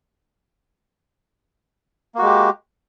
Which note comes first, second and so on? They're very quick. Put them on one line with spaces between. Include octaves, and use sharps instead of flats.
A#3 F#4 G#3 G4